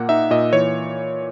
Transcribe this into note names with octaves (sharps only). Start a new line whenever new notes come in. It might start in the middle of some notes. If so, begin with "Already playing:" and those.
Already playing: A#2 A#3 F#5
D#4 E5
A#2 D#5
E3 C#5